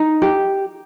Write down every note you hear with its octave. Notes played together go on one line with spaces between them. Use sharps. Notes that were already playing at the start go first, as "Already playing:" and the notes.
Already playing: D#4
G4